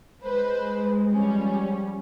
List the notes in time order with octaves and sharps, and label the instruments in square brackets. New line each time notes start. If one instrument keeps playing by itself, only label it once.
[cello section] G#3 [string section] B4 C5
[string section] F3 G3 C#4